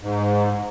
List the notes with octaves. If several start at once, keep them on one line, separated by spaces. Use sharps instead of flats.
G#2